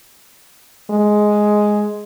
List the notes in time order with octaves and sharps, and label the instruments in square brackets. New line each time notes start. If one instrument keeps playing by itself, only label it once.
[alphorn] G#3